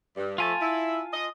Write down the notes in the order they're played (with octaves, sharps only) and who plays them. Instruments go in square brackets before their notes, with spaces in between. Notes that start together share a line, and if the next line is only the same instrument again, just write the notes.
[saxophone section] G2
[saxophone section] F3 A3 [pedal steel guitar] F4 G#5 A5
[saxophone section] E4
D#5